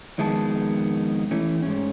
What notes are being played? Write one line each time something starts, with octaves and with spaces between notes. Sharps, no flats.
F2 D#3 G#3 B3 A5
E3 A3 C#4
G#2 C#4